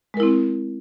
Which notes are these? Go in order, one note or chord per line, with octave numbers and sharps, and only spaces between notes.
G#3 C4 E4 A#4